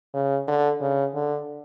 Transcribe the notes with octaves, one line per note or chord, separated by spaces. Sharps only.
C#3
D3
C#3
D3